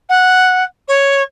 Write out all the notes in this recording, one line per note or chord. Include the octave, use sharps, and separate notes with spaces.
F#5
C#5